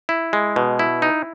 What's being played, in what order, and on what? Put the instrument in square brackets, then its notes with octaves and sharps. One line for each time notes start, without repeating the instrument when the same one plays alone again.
[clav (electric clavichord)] E4
G#3
B2
E4
D#4